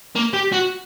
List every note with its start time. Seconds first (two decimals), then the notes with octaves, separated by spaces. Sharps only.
0.15 A#3
0.33 G4
0.53 F#4